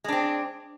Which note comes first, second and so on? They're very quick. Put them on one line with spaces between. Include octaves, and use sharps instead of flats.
G#3 D4 C4